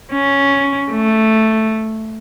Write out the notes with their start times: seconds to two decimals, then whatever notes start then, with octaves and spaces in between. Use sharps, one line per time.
0.13 C#4
0.91 A3